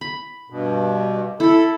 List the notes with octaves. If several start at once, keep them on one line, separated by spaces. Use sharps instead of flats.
B5
G2 B2
E4 A4 B5